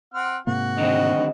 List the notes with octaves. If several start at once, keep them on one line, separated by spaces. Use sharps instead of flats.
C4 F#5 F6
G#2 C3 A#3 F#4
D3 D#3 C4 D#5